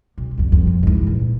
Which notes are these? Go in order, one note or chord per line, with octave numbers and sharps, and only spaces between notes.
B1
B1 F2
F2
F3
G#2 E3
A#2